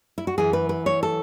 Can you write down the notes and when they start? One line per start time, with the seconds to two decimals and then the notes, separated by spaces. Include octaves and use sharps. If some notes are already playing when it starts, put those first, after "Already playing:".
0.18 E4
0.27 F#4
0.38 F#2 E3 G#4
0.53 B4
0.69 B4
0.86 C#5
1.03 A4